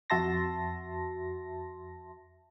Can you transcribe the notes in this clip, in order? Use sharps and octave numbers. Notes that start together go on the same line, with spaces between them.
F2 F#4 E5 A5 C6 A#6